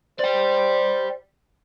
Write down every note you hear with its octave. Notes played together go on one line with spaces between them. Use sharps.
C5 D5 G5